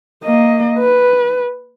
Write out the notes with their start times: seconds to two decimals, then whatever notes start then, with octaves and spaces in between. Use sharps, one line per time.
0.24 A#3 D#5
0.79 B4